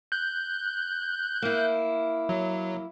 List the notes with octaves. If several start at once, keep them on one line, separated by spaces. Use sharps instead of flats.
F#6 G6
A#3 E4
F#3